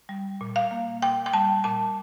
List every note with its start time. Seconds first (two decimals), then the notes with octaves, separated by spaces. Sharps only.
0.09 G3
0.41 A#2
0.56 F5
0.71 A#3
1.02 A#2 G5
1.26 G5
1.33 G3 A5
1.64 A#2 A5